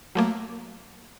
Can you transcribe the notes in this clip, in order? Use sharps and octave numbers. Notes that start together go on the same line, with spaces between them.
F#3 A3 A#3